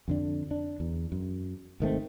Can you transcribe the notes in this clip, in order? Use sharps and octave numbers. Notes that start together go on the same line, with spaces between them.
F2 D3 D4
D4
E2
F#2
G#1 D#3 A3 C4